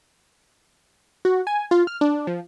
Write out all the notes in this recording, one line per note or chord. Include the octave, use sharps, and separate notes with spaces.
F#4
G#5
F4
F6
D4
F3